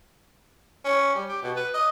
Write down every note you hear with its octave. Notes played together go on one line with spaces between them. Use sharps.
C#4
G3
G4
B2
B4
D#5